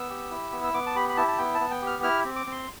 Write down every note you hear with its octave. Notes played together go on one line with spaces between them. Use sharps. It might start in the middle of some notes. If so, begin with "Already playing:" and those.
Already playing: B3 E6
G4
E4
B3
E6
B3 D6
A5
G4 B5
B5
E4 A5
A5
B3 G5
A5
B3
G5
G4 F6
E4 F6
C4
D6
C4
C6